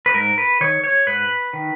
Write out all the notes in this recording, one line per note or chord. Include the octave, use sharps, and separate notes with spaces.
B4
G#2 A#4
B4
D#3 C#5
C#5
G#2 B4
D#3